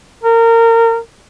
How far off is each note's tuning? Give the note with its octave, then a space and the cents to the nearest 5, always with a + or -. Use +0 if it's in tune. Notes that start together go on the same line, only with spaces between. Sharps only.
A#4 -25